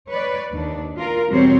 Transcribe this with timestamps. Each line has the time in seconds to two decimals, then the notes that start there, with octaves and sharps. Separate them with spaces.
0.10 B4 C#5 D5
0.51 D#2 D4
0.96 F4 A#4
1.30 E2 B2 G3 C4 C5 C#5